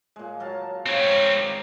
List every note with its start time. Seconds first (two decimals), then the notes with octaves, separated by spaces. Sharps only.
0.16 A#2 G#3
0.40 F#3 F5 A5
0.86 G#2 C#3 C4 C#5
1.36 D#3 D5